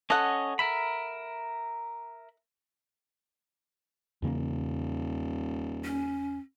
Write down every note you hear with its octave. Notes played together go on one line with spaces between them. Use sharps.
C#4 A4 D#5 F#5
A#4 E5 B5
D#1 E2 C#3 A#3
C#4